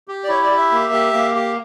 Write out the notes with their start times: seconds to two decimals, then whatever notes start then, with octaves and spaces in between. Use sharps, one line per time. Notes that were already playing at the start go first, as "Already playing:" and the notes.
0.08 G4
0.24 D5
0.29 E4 C#5
0.43 D5
0.50 G4
0.57 E5
0.71 A#3
0.93 G4
1.14 A#3
1.35 G4